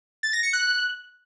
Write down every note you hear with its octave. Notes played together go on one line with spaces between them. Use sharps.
A6
A#6
C#7
F#6